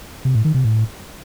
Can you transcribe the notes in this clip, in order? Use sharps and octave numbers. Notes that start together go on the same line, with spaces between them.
C3
A2
D#3
C3
A2